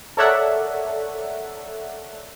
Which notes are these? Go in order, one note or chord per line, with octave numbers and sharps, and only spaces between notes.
A4 A#4 C#5 D5 E5 F#5